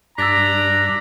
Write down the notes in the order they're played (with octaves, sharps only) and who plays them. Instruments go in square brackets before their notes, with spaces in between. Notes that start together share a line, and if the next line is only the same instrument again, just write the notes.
[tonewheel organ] G2 [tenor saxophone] D4 [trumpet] A#5 [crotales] E6 A6 B6